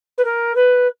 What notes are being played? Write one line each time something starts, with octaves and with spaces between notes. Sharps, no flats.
B4
A#4
B4